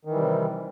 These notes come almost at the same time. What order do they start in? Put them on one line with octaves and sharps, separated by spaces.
D#3 E3 G3 C3